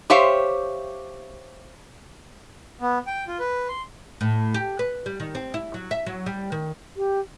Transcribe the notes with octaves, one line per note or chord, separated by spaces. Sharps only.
G4 C5 C#5 E5 F5
B3
G5
F4
B4
C6
A2
G4
B4
G3
D#3
C4
E4
F#3
E5
F#3
G3
D#3
G4